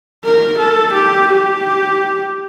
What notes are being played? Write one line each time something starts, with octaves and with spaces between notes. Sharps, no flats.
A#4
A4
G4
G4